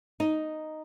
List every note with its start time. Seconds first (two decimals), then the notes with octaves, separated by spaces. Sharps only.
0.20 D#4